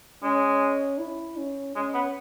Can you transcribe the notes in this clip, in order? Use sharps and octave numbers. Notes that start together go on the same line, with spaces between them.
G#3 C#4
E4
C#4
G#3 C#4
B3